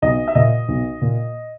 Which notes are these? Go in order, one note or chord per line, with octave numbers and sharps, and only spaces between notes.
B1 D#5
E5
A#2 D#5
B1
A#2